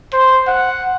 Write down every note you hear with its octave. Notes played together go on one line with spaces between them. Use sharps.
C5
F#5